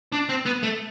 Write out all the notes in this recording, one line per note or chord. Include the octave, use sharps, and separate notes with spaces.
D4
C4
B3
A3